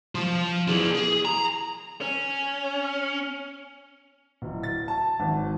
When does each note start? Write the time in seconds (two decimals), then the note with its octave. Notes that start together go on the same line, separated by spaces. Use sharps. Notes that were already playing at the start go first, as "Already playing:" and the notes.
0.15 F3 F4
0.68 E4 G#4
0.95 G#4
1.25 A#5
2.01 C#4
4.42 D1
4.63 A6
4.88 A5
5.20 G#1